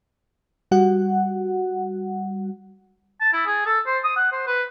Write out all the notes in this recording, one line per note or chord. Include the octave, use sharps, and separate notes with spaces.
G3 F#4 F#5
A5
E4
G#4
A4
C5
D#6
F#5
C5
B4